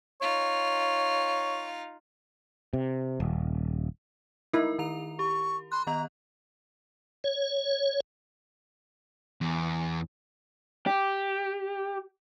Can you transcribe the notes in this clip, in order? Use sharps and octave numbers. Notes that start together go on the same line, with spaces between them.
D#4 F4 C#5
C3
D#1
D#4 E4 A#4
D#3 A#5 F7
G4 C#6
B5 C6 F#6
D#3 B3 D#5 A#5
C#5
E2
G4